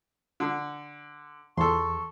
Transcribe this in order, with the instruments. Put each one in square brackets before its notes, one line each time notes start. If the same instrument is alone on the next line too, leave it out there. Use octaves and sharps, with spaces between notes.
[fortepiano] D3
[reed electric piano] E2 [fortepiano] A4 C6 [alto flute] C#6